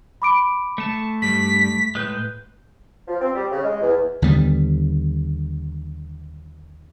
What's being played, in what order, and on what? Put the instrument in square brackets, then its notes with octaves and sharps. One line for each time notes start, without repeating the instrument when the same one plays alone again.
[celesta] B5 D6 D7
[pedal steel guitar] A3 A5
[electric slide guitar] G2 G3 [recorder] B6
[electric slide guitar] A2 [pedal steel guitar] G#3 B4 G6
[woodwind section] F3
C4
G3
C#3
G#3
E2
[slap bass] D#2 D3 G3 B3